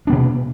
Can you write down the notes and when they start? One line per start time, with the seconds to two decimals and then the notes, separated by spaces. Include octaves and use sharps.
0.07 D4
0.10 B3
0.12 B2